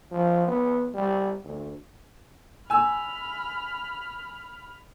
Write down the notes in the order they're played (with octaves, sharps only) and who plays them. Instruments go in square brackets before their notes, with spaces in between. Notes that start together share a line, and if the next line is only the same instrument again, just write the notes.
[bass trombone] F3
B3
G3
D2
[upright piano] G#5 E6 [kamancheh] B5 F6